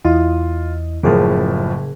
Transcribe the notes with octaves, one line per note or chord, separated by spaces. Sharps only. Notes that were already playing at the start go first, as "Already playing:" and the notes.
E2 E4 F4 D#5
F#1 A2 C#3 F3 G#4 A#4